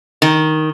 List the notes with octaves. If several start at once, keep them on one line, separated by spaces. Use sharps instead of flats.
D#3